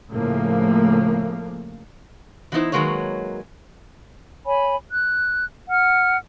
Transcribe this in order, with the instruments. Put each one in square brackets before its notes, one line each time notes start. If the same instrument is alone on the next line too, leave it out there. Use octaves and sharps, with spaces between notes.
[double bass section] A2 C#3 F3 A3 A#3
[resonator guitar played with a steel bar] E3 F#3 B3 D#4 E4 C5
D#3 F#3 G#3 A#3 B4 C#5
[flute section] C#5 G#5 B5
F#6
F#5 F6